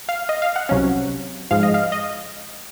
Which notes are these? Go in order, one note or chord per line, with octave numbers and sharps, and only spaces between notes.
F5
D#5
F5
F#5
C2 C3 F#3 C#4
G#2 F3 G#3 F5
D#5
F5
D#5